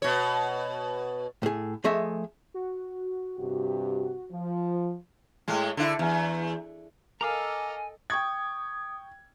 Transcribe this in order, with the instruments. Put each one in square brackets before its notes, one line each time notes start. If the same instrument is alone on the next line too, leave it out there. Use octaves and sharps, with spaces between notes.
[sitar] B2 C#5
[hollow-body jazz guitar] A2 G#4
F3 A3 G#4 D#5 E5
[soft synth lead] F#4
[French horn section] G2 C3 G4
F3
[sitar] A2 G#3
D3 E4
E2
[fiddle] A4 D#5 [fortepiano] A#4 F5 [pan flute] G#5 [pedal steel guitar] A#5 D6 E6
[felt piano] G5 C#6 G#6 [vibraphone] D#6